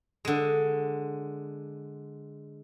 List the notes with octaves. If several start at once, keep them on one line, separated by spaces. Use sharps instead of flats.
D3 G#3